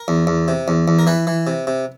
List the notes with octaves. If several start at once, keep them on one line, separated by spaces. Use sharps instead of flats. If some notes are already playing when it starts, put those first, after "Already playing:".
Already playing: A#4
E2
E2
C3
E2
E2
A#4
E3 B4
E3
C3
C3